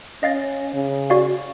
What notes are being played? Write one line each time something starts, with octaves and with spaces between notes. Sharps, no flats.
C#4 D#5 F5 A6
C#3
F#4 D5 F5